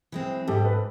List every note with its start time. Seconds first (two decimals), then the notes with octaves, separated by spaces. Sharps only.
0.12 E3 G#3 C4
0.48 G#2 G4 A4
0.65 A4 B4